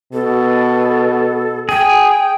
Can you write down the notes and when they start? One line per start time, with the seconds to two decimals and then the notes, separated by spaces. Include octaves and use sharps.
0.13 B2 A4
1.69 G#4 G5